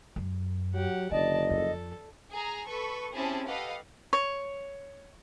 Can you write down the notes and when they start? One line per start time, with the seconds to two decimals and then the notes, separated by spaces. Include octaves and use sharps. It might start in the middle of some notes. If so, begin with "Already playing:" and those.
0.16 F#2
0.74 F#3 G4 F#5
1.11 F#1 D3 D5 D#5 A5
1.50 F2 A4
2.31 G#4 A#5
2.67 A4 B4 C#6
3.14 C4 C#4 E4 G4 G#4 A5
3.47 G4 A4 B4 D#5 F5 F#5
4.13 C#5